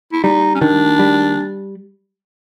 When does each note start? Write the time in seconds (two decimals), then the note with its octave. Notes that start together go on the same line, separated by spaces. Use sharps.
0.12 E4
0.24 G3 D#4
0.55 C#4
0.61 D#3 D4
0.99 G3